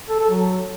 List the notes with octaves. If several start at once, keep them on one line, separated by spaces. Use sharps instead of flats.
A4
A4
F#3